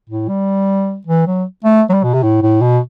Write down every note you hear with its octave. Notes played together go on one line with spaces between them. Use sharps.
A2
G3
E3
F#3
A3
F#3
G3
B2
C3
A2
A2
B2